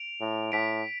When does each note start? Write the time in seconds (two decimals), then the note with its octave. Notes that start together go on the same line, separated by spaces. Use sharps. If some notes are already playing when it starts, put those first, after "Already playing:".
Already playing: D7 F7
0.20 A2
0.52 A2 B6 D7